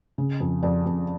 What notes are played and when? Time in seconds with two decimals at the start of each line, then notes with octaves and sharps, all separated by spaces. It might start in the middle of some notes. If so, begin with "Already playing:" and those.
0.18 C#3
0.40 F2
0.63 F2 D5
0.86 F2